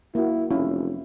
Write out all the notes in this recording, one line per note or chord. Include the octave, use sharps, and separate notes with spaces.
A#3 E4 F#4
F1 C#4 E4 F5